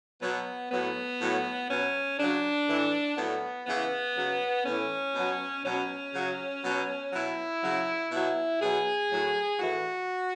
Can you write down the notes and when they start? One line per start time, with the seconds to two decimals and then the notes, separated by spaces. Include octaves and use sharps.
0.21 B2 F#3 B3
0.71 A2 F#3 B3
1.20 A2 F#3
1.70 B2 F#3 C#4
2.18 C#3 F#3 D4
2.68 A2 E3
3.17 A2 F#3 B3
3.67 C#3 E3 B3
4.16 C#3 F#3
4.65 A2 E3 C#4
5.15 B2 F#3
5.64 B2 F#3 C#4
6.13 C#3 F#3
6.64 B2 F#3
7.13 B2 F#3 E4
7.63 C#3 F#3
8.11 B2 F#3 E4
8.61 B2 F#3 G#4
9.10 A2 F#3
9.59 A2 E3 F#4